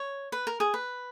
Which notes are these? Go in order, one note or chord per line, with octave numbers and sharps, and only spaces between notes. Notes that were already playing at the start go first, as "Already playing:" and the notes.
Already playing: C#5
B4
A#4
G#4
B4